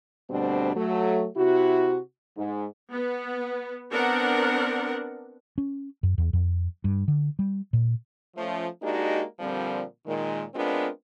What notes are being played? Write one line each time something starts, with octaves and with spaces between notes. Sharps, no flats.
D2 B2 G3 C4 D4
F#3 A3
C3 E4 F#4
G#2
B3
B3 C4 D4 A#4 F#5
C#4
F#2
E2
F2
G2
D3
G3
A#2
F3 A3 C#4
G#3 A#3 D4 D#4 F#4 G4
A#2 D3 F3 G3 C4
A#2 D#3 G#3
G#3 B3 C4 D4 F4 A#4